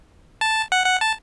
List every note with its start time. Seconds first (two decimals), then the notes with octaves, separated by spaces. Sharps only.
0.41 A5
0.72 F#5
0.86 F#5
1.01 A5